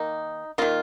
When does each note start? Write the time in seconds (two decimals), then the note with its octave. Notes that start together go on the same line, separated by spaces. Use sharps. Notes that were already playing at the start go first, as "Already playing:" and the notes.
Already playing: D#3 A#3 D#4
0.58 D#3 A#3 F4